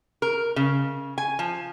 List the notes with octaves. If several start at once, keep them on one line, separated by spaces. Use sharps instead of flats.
A#4
C#3
G#5
F3